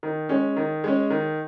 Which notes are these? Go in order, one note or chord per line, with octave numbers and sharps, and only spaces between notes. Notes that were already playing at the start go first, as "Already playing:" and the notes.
D#3
G#3 C#4
D#3
G#3 C#4
D#3